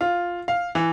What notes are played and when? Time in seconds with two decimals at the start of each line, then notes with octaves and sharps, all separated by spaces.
0.01 F4
0.48 F5
0.75 E3